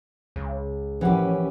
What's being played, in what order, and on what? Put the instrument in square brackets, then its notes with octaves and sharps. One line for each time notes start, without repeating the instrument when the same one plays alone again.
[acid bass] C#2
[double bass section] A1 C#4 [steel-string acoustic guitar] E3 G4 [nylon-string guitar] F3 A#4 F#5